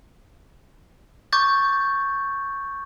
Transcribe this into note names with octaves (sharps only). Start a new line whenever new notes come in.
C#6 D6 G6 A6